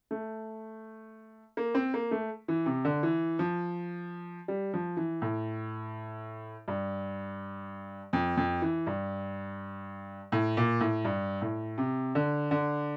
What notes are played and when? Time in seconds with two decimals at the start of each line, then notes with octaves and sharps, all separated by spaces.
0.11 A3
1.57 A#3
1.75 C4
1.94 A#3
2.11 A3
2.48 E3
2.66 C3
2.85 D3
3.03 E3
3.39 F3
4.48 G3
4.74 F3
4.97 E3
5.22 A2
6.68 G2
8.13 F2
8.37 F2
8.62 E3
8.87 G2
10.32 A2
10.57 A#2
10.80 A2
11.05 G2
11.41 A2
11.78 C3
12.15 D3
12.51 D3